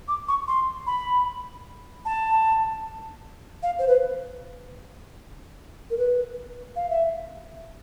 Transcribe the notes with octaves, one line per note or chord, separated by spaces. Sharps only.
D6
C#6
C6
B5
A5
F5
C5
B4
A#4
B4
F5
E5